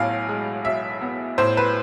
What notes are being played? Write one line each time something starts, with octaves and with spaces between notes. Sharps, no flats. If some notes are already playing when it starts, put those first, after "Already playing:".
Already playing: B1 A2 B3 F5 G#5
G#3
B1 E5
B3
A2 C5
B4